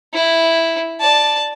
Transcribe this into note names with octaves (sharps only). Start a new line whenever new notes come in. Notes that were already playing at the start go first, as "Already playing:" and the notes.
E4
D5 A5